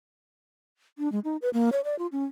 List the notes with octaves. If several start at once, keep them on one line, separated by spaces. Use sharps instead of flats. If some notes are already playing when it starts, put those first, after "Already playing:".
D4
G#3
D#4
B4
A#3
C#5
D5
F4
C#4